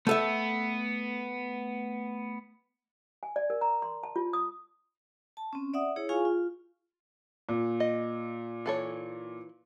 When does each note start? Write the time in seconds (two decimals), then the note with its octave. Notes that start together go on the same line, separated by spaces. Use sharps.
0.07 A3 B3 A4 E5
3.23 G#5
3.36 D5
3.50 A#4
3.61 A#5
3.82 C6
4.03 A5
4.16 F4
4.33 D#6
5.37 A5
5.53 C4 C#4
5.74 D5 E5 F#5 D#6
5.96 E4 G#4 C#5
6.09 F4 G#4 F5 G#5 C#6
6.25 F4
7.49 A#2
7.80 D#5
8.66 E3 A4 C#5